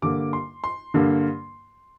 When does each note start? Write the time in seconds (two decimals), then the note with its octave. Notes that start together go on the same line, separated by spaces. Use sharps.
0.02 G2 D3 A#3 D6
0.33 C6
0.64 C6
0.94 G2 D3 A#3